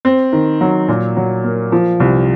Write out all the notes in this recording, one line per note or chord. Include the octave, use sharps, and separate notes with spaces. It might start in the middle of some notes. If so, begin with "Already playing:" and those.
C4
D#3
F#3
A#2
F#3
A#3
F3
C2